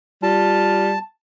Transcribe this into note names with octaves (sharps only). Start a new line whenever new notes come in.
G3 F4 A5